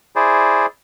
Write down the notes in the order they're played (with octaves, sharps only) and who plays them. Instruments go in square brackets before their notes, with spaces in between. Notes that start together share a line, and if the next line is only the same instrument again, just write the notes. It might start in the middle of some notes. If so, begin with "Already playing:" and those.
[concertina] E4 G#4 C5 D5